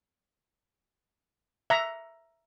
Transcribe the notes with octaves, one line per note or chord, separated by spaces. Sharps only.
E5 A#5